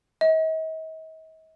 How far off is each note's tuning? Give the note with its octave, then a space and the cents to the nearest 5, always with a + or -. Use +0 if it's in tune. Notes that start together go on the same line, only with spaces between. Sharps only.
D#5 +45